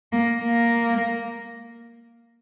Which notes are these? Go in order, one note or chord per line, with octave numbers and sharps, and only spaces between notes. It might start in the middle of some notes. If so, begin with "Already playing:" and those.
A#3
A#3